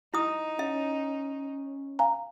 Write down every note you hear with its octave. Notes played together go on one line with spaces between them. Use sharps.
D#4 E4 D#6
C#4 E5
F5 G#5 A#5